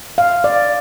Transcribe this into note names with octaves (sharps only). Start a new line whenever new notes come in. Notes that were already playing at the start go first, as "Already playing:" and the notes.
F5
D5